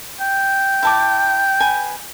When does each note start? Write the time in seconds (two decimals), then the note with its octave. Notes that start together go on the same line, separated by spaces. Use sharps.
0.20 G5
0.83 E4 A5 D6
1.60 B4 G#5